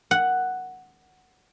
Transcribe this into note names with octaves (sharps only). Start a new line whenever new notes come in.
F#5